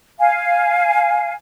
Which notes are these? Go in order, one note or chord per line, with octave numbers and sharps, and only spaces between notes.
F5 G#5